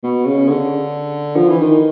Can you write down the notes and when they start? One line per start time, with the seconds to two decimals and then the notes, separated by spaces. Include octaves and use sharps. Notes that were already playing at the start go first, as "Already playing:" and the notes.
0.04 B2
0.25 C#3
0.48 D3
1.36 F3
1.49 E3
1.62 D#3